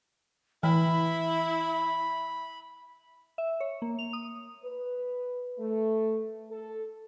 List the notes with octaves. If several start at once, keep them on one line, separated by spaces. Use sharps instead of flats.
E3 E4 B5
E5
C#5
A#3
F7
D#6
B4
A3
A4